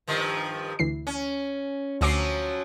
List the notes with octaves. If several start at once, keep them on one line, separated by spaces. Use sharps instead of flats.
G2 D#3 F3
D2 E3 C7
C#4
D2 F3 F#3 C#4 D6 C7